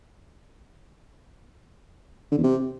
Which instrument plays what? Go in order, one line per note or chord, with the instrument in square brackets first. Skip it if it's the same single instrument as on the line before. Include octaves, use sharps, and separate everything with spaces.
[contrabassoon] D3
E2
C3